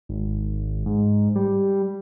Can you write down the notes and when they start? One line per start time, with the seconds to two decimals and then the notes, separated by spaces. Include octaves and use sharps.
0.09 G#1
0.86 G#2
1.35 G3